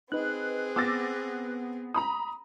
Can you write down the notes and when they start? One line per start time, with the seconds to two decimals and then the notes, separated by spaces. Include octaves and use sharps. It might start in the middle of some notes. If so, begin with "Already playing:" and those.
0.12 C4 D#4 G#4 B4 F#6
0.76 B3 D6 E6 A6 A#6
1.94 A#5 B5 D#6